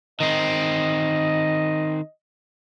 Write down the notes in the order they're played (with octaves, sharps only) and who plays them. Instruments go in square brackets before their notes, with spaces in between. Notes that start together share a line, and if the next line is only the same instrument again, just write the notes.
[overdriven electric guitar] D#3 C4 [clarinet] D#5